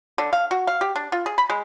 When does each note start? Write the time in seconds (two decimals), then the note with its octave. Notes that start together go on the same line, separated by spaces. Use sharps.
0.18 D3
0.33 F5
0.51 F#4
0.67 F5
0.81 G4
0.96 D4
1.12 F4
1.26 G#4
1.38 B5
1.50 G#3